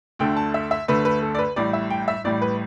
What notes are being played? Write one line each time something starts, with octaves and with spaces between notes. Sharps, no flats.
D2 D3 A3 G5
A5
E5
E5
D2 D3 A3 B4
B4
A4
D5
B4
A1 A2 G3 D5
E5
G5
E5
A1 A2 G3 D5
B4